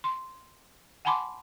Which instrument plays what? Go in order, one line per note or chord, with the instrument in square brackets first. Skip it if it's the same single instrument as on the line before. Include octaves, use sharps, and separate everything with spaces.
[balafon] C6
F#5 G#5 A5 B5 C6 D6